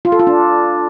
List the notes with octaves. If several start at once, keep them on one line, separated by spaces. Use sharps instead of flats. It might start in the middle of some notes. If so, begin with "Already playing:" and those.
F4
A4
F4
D4